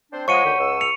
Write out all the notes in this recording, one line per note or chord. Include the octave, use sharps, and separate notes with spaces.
C4 D4 C5
F3 G#3 C#5 F#5 C#6 C#7 D#7
D2 D#3 G4
C#2 E6
C#7 F7